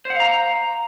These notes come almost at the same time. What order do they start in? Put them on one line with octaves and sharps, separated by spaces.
C5 F#5 F5 A#5